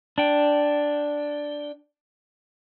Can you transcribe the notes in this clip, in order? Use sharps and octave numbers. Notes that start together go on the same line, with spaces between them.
D4 G5